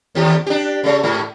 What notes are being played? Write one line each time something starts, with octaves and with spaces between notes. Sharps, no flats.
D#2 G4
D4 G4
C#3 A3
G#2 A3